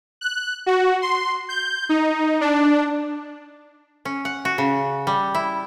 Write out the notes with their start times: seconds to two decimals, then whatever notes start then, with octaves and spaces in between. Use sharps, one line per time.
0.21 F#6
0.66 F#4
1.02 C6
1.49 G6
1.89 D#4
2.41 D4
4.05 C#4
4.25 F#5
4.45 F#4
4.58 C#3
5.07 G3
5.34 E4